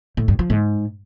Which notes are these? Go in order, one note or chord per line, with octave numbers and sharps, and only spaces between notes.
A2
G2
F3
G#2